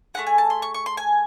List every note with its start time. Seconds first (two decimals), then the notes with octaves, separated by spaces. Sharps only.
0.14 A3 C#4 G#4 F#5
0.27 G#5
0.38 A5
0.50 C6
0.62 C#6
0.74 C#6
0.86 C6
0.97 G#5